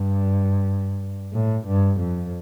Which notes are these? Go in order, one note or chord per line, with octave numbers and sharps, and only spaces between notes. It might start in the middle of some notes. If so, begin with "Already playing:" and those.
Already playing: G2
A2
G2
F2